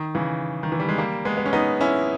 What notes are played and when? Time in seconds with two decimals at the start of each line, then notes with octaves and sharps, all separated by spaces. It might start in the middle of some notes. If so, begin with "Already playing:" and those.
Already playing: D#3
0.15 C#3 E3
0.63 D#3
0.72 E3
0.80 G3
0.89 G#3
0.98 G3 A#3
1.25 G#3 B3
1.37 B3
1.46 C#4
1.53 B3 D#4
1.81 C#4 E4